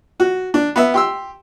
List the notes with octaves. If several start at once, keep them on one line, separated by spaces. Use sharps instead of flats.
F#4
D4
B3 E5
G4 C6 E6